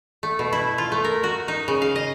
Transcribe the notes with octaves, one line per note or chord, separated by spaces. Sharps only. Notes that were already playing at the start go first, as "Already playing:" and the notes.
A3
B2
E4
F4
A3
A#4
F#4
D#4
C#3
F5
D#5